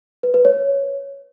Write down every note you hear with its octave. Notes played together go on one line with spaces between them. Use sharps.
B4
B4
C#5